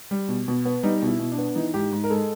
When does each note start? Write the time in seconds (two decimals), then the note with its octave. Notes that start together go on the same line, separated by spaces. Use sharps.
0.11 G3
0.29 B2
0.48 B2
0.65 B3
0.83 G3 D#4
1.02 B2
1.08 E4
1.19 B2
1.32 D4
1.38 B3
1.56 E3 D#4
1.74 G#2 G4
1.92 G#2
2.04 A#4
2.10 G#3 A4